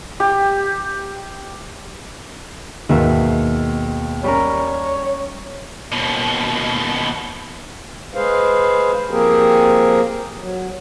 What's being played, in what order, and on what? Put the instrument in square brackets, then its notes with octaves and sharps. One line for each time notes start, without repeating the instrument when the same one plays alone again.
[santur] G4
[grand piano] D#2 [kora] G#2 B2 E5
[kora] G3 C#4 A#4 [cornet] C#5
[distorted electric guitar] D#2 B2
[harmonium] G#3 G#4 B4 C5 F5
F3 A#3 C4 G4 G#4 A#4
F#3